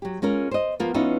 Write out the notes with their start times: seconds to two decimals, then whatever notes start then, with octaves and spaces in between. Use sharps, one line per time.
0.02 F#3 G4
0.22 G#3 C#4 F4 A#4
0.51 C5 D#5
0.80 F3 A#3 B3 F4
0.94 E3 B3 C#4 D#4 F4 E5